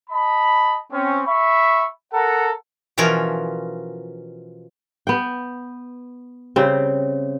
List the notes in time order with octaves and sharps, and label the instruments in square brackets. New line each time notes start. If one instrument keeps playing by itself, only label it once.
[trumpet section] D#5 A5 B5
C4 C#4
E5 B5 C#6
A4 A#4 F#5 A#5
[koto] B2 E3 F3 C#4 A#4
[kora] B3 G5
C#3 G3 C4